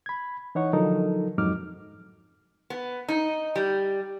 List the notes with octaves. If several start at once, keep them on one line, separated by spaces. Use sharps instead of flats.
B5 G#6
E3 D#4 C#5 F#5 C#6
D3 F3 F#3 D#4 A4 A#4
F2 G#2 F#3 D#4 D6 F6
B3
D#4
G3